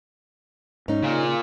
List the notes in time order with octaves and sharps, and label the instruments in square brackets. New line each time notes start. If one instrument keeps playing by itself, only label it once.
[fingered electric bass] G#2 [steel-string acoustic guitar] C#4 D#4
[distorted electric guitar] A#2 [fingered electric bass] C#3